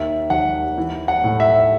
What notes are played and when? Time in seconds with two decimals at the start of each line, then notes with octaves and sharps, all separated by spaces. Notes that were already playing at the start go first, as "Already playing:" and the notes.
Already playing: D#2 D#3 E5
0.30 D#2 F#5
0.78 E3
1.08 F#5
1.24 A2
1.40 E5